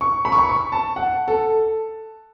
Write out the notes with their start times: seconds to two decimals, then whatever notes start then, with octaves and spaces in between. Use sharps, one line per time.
0.01 C#6
0.25 B5
0.32 C#6
0.38 B5
0.49 C#6
0.72 A5
0.96 F#5
1.28 A4